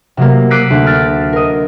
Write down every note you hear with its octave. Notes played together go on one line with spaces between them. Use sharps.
C3 F#3 A#3
D6 E6 F#6 B6 C7 D#7
D2
F6 A6 B6 D7
A#4 D#5